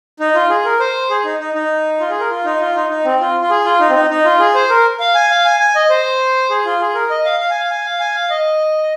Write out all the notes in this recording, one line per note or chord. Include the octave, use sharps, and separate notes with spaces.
D#4
F4
G#4
A#4
C5
G#4
D#4
D#4
D#4
F4
G#4
A#4
F4
D#4
F4
D#4
D#4
C4
F4
F4
G#4
F4
D#4
C4
D#4
D#4
F4
G#4
C5
A#4
F5
G#5
F5
G#5
G#5
D#5
C5
G#4
F4
G#4
A#4
D#5
F5
F5
G#5
F5
G#5
F5
G#5
F5
D#5